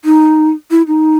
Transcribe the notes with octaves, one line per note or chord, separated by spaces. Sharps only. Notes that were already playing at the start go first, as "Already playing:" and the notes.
D#4
E4
D#4